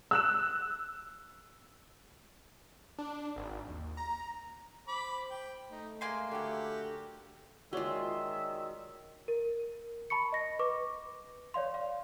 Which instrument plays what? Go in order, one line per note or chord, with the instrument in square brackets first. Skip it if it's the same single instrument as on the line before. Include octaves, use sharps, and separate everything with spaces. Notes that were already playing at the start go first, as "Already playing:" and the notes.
[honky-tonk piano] E6 F#6 E7
[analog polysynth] D4
G#1
D#2
A#5
[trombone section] C5 [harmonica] B5 D6
[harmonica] G5
[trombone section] A3 [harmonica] D#4
[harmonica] G#3 [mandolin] A#3 G#5 C6
[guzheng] D3 A4 [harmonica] F#4 G4
[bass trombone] D#3 [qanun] G#3 F4 [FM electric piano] F#4 C#5 D5 [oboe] E5
[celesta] A#4
A5 B5 C#6 C#7
D#5 A#6
B4 C#6 D6
C#5 D5 F5 C6
F5